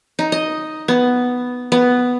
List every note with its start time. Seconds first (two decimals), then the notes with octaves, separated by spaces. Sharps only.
0.19 D#4
0.32 D#5
0.88 B3
1.72 B3